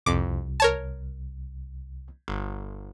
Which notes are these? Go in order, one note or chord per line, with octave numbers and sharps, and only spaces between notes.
C2 F2 D6
A#4 C#5 A5
G1